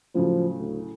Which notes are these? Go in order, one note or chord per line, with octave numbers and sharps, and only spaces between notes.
A2 C#3 F3 F#3
D2